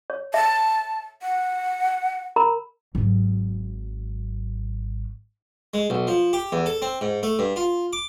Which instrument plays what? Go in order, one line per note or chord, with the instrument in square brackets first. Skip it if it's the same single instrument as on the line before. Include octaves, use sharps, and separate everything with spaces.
[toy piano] C#5
[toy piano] E5 [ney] A5
[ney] F#5
[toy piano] A#4 A#5 B5
[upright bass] G#1 F#3
[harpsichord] G#3
B1
F3
G4
E2
A4
C4
G#2
A3
G2
F4
D6